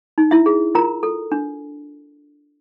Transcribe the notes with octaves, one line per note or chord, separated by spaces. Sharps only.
D#4
E4 E5
G#4
F4 A#4 A#5
A4
D4